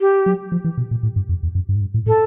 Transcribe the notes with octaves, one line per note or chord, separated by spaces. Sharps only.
G4
F#3
F3
E3
B2
A#2
A2
G2
F2
E2
F#2
G2
G#2
G2
A2
A2 A4